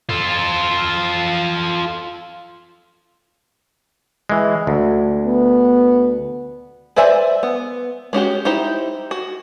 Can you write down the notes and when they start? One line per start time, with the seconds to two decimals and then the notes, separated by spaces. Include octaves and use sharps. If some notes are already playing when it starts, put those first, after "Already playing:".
0.09 F4 A4
4.30 E3 G#3
4.67 D2
5.27 B3
6.96 B4 C5 D5 E5 G#5
7.43 B3
8.13 G#3 C#4 F#4 G4
8.45 D#4 E4 G4 C5
9.11 F#4